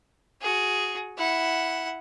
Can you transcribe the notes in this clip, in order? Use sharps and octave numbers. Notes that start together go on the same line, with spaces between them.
F#4 G#4
E4 F#5